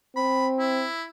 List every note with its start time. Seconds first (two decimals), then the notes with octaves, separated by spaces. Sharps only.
0.16 C4 B5
0.59 E4